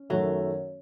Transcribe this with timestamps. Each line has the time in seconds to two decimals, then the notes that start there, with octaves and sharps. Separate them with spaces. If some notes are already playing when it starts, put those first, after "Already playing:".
Already playing: C#4
0.10 F#2 D#3 F#3 A3